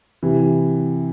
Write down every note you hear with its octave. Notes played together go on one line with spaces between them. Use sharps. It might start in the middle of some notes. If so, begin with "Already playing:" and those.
C3 E3